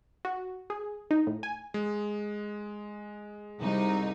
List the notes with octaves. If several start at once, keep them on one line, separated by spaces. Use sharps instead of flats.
F#4
G#4
D#4
A2
G#5
G#3
C2 D#4